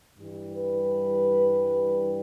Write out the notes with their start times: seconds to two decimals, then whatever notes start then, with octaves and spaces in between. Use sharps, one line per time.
0.18 G2 E3 G3
0.54 B4